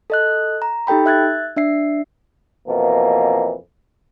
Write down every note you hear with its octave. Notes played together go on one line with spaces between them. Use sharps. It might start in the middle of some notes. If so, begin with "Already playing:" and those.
A4 D#5 F#6
A#5
D#4 G4 A4 G5 B5
E5 F#6 G#6 A6
D4 E5 C7
F2 B2 E3 A#3